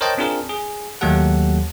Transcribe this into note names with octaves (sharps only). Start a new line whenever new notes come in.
A#4 C5 C#5 D#5 G5 A5
C4 D4 F4 G#4 A#4
G#4
D#2 F#3 A3 G4 A4 F#5